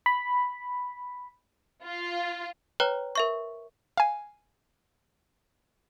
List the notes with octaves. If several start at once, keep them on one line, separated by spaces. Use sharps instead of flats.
B5
F4
B4 C#5 G5 A#5 F#6
A#4 E5 C#6
F5 G#5